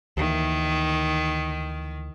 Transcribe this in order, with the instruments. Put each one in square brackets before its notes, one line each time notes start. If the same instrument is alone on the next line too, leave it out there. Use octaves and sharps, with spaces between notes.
[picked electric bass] D2 E3 A#3 [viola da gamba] D#3